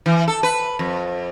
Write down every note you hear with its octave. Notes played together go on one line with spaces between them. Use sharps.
E3
A4
B4
F2